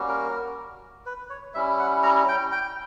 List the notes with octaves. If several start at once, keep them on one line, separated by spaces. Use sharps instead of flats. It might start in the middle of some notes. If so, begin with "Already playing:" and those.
Already playing: G3 A#3 C#4 F#4
A#4
B4
C#5
G3 C#4 E4 E5
F#5
A#5
G5
G5